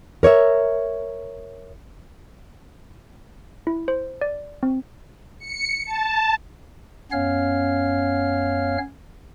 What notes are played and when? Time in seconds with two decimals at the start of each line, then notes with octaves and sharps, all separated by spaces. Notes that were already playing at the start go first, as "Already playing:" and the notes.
0.23 A#4 C#5 D5 E5
3.67 E4
3.88 C5
4.21 D5
4.63 C4
5.39 C#7
5.85 A5
7.11 F#2 B3 C#4 C#5 F5 F6